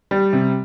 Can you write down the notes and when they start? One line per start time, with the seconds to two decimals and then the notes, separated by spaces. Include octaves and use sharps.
0.11 G3
0.33 C3